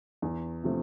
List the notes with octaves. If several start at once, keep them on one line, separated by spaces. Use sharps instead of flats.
E2
C3 F3 A3